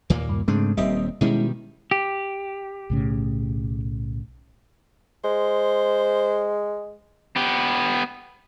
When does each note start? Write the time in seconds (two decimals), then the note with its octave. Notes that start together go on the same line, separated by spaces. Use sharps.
0.10 D#2 A#2 A#3
0.29 G2
0.48 G#2 C#3 G#3 A3 C4 D4
0.77 D#1 D#2 G3 C4 D#5 E5
1.21 B2 D#3 G3 G#3 C#4 E4
1.91 G4
2.90 B1 A2 C#3
5.24 G#3 C5
7.36 B3 G4